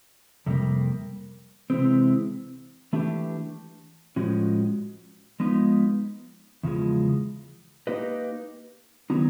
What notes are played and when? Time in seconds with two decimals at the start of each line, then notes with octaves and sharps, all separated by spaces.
0.46 F2 C3 G3 A#3
1.70 C3 E3 G#3 C4
2.93 E3 A3 D4 G4
4.16 A2 F3 G#3 C#4 F#4
5.40 F3 G#3 B3 D#4
6.63 E2 C#3 F3 G#3
7.87 A#3 D#4 G4 B4 D#5
9.10 D#3 F#3 B3 D#4